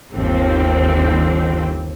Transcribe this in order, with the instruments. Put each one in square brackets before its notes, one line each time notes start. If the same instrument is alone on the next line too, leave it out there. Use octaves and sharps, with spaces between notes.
[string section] G1 D#2 C4